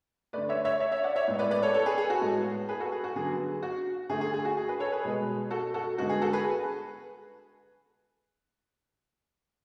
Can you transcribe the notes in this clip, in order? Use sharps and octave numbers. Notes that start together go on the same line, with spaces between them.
D3 A3 B4 D5
C#5 E5
C#5 E5
C#5 E5
C#5 E5
D5 F#5
C#5 E5
A2 G#3 B3
B4 D5
B4 D5
A4 C#5
A4 C#5
G#4 B4
G#4
F#4 A4
A2 G#3 B3
G#4 B4
F#4 A4
G#4
F#4
D3 F#3 B3 G#4
F#4
D3 A3 G#4
G#4
G#4
F#4
G#4
G#4 B4
A4 C#5
G#4 B4
B2 G#3 B3
F#4 A4
F#4 A4
D3 G#3 B3 F#4
G#4
F#4 A4
G#4 B4